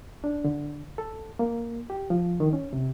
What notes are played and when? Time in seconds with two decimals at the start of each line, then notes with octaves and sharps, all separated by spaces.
0.24 D4
0.44 D3
0.98 A4
1.39 A#3
1.90 G4
2.10 F3
2.40 D#3
2.53 C#4
2.73 C3